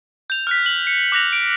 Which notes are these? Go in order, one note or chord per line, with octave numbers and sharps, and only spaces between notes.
G6 F7
F6 F#6 B6
F#7
C#7
D6 F#6 A#6 F7
D7